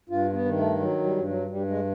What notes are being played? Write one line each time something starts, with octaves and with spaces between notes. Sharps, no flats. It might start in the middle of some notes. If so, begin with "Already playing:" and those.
G2 F4
B3
D#3
A3
F#3
G3
G2
F#3
G2 G3
G#3